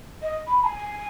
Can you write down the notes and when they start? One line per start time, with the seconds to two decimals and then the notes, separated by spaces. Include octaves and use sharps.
0.22 D#5
0.47 B5
0.59 B5
0.63 G#5